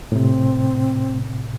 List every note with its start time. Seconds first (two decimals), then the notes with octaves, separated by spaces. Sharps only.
0.12 A2 C3 C4